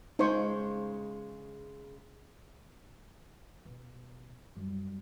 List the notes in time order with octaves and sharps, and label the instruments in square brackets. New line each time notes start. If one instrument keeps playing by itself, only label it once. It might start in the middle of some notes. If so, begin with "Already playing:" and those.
[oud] C#3 G#3 [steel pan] D#4 C5 C#6
[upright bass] B2
F#2 G3